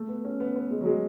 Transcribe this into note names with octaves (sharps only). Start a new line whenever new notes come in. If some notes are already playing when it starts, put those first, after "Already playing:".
Already playing: A3
B3
C#4
B3
B3
G#3
F#3
G#3